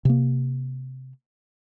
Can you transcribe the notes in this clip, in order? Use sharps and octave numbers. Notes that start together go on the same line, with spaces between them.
C3 A#3